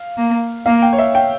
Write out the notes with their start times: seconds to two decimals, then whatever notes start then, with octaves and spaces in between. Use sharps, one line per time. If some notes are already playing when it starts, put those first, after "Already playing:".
Already playing: F5
0.17 A#3
0.66 A#3 F5
0.82 G5
0.93 C#5
0.98 E5
1.15 G5